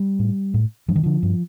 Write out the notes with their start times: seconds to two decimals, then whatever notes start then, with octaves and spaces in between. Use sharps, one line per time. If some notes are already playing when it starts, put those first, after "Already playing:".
Already playing: G3
0.19 A2
0.54 A2
0.88 G2 F3
0.96 D#3
1.03 D3 F3
1.23 G2